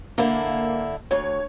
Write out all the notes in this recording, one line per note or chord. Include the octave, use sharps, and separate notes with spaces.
D3 A#3 E4
D2 C#5